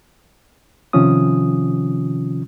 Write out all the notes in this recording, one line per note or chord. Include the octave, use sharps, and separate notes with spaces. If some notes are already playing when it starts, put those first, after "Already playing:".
C3 D#3 F3 C#4 F4 D#6